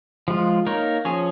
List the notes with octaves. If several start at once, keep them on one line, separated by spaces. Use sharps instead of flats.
F3 G#3 F4
A#3 D#4 A#4 C#5
F3 C#4 G#4 C#5